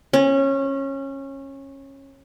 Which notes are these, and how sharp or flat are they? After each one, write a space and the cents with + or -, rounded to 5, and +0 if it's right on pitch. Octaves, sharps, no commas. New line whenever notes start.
C#4 -20